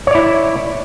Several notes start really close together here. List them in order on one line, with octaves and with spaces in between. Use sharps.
C#5 D5 E4